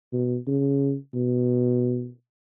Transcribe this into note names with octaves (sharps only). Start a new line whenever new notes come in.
B2
C#3
B2